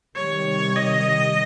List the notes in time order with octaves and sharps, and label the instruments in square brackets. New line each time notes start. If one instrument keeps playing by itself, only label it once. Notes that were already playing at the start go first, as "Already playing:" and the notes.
[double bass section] C3 D#3 G3 [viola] C#5
[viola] D#5